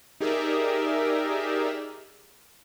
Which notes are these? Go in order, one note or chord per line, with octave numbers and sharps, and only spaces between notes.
D#4 G4 G#4 A#4 D5 E5